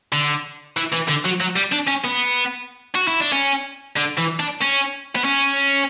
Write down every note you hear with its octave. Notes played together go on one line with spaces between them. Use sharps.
D3
E3
E3
D3
F#3
F#3
G3
D4
C#4
B3
F#4
E4
D4
C#4
D3
E3
D4
C#4
B3
C#4